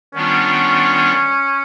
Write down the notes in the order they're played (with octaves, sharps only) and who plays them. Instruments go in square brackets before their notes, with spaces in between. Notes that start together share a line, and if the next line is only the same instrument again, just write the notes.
[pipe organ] D#3 G3 B3 D4 F4 [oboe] C#4